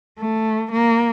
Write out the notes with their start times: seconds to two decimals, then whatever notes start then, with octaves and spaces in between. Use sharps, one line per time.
0.19 A3
0.72 A#3